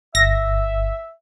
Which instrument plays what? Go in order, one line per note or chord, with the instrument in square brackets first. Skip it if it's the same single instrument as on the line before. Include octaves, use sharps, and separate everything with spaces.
[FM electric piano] G1 [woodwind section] E5 [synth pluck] A#6